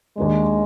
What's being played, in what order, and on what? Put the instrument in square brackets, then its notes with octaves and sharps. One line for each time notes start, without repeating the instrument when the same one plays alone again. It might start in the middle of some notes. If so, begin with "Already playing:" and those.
[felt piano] D#2 D#3 A#3 D4 [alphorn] G#3